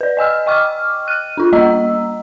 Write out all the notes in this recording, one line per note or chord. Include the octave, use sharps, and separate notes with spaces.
B4 D5
D#5 G#5 E6 F6
D#5 G5 C#6 D6 F6
F6 F#6 D#7
D4 F4
G3 A#3 D#5 A#5 E6